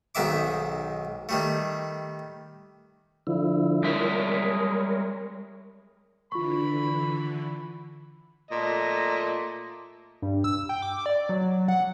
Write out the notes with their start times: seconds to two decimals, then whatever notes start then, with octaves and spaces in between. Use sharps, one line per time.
0.15 B1 G#2 D#3 E5 D6
1.29 D#3 G3 A3
3.27 D3 F3 E4
3.84 G3 G#3 A#4 C#5 E5
6.32 D3 E3 F4 B5 C#6
8.51 A#2 A3 D#5
10.22 G2
10.44 E6
10.69 G5
10.82 D6
11.06 D5
11.29 F#3
11.68 F#5